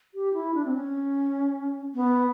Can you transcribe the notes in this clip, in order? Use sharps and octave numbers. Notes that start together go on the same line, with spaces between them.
G4
E4
D4
C4
C#4
B3